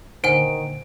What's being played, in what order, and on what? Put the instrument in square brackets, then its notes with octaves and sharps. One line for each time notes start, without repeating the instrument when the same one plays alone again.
[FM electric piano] A#2 D3 D#4 [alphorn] D#3 [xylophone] C5 F#5 G#5 [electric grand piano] D7